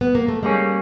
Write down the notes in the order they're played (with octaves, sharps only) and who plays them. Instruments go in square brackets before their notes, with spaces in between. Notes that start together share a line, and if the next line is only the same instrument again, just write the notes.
[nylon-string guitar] B3
A#3
A3
[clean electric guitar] G3 A#3 C#4 [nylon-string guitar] G#3